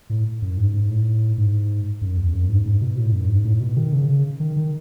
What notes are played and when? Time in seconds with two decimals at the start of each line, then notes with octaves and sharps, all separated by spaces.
0.10 A2
0.42 F#2
0.57 G#2
0.74 G#2
0.90 A2
1.38 G#2
2.01 F#2
2.17 E2
2.33 F#2
2.49 G#2
2.66 G#2
2.81 B2
2.97 A2
3.12 F#2
3.29 G#2
3.44 A2
3.61 B2
3.77 D#3
3.93 C#3
4.09 C#3
4.40 D#3
4.56 D#3